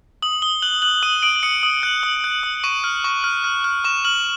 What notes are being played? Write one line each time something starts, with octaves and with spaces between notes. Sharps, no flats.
D#6 F#7
D#6 G7
F#6 F#7
F#6 F#7
D#6 D#7
D#6 D7
D#6 C#7
D#6
F#6
D#6
F#6
D#6
C#6 D#7
F6
C#6
F6
F6
F6
C#6 E7
F6 F#7